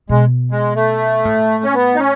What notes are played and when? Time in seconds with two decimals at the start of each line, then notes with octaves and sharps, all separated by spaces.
0.09 B2 G#3
0.51 G#3
0.75 A3
1.25 A2
1.64 C#4
1.74 B3
1.95 D#4
2.00 C#4